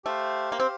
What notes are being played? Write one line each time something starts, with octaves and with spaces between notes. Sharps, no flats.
A3 G4 C5 F5
A#3
C4